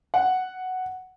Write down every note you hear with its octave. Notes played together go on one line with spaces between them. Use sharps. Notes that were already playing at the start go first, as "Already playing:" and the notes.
F#5